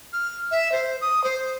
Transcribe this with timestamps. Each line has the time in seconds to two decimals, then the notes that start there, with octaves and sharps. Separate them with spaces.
0.12 F6
0.51 E5
0.71 C5
1.01 D#6
1.23 C5